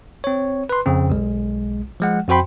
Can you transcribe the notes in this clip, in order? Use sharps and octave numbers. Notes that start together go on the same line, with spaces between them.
C4 C#5
B4 C6
F2 C#3 C4
B1 G#3
F3 G#3 F#5
F2 F#4 C5 G5 B5 C6